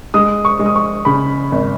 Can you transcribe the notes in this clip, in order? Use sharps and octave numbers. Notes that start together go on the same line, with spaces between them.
G#3 D#6
C#6
G#3
D#6
C#6
C#3 B5
G#1